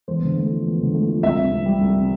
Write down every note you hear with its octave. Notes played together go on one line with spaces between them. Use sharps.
E2 C5
D3
A3
F3
E2
D3
A3
F3
C2 E5
C3
C2
G3
C2
C3